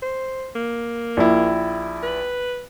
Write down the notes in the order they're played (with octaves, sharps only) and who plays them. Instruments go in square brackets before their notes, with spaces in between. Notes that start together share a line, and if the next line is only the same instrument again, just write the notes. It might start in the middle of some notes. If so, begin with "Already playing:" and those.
[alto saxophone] C5
A#3
[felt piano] A#1 E4
[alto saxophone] B4